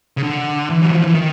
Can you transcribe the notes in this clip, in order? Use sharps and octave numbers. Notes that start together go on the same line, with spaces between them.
C#3
D3
E3
F#3
F3
E3
D#3